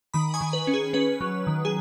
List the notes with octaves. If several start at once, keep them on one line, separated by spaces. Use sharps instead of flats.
D#3 B5 D#6
G#5 C#6
D#3
B4
C#4
G#4
C#4 B4
F#3
D#3
G#4